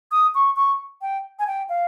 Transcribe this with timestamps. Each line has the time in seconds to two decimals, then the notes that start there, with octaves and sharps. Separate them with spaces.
0.11 D#6
0.35 C#6
0.56 C#6
1.02 G5
1.39 G#5
1.47 G5
1.69 F5